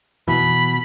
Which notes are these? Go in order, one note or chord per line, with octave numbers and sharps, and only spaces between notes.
B2 E3 B5